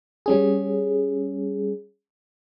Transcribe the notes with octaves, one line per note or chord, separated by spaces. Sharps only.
G3 C#4 G#4